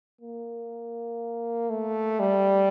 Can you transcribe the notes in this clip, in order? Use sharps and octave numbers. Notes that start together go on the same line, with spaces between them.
A#3
A3
G3